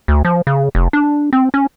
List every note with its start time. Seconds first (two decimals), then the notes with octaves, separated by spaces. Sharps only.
0.08 D2
0.25 F3
0.47 C#3
0.75 F1
0.93 D4
1.33 C4
1.54 C#4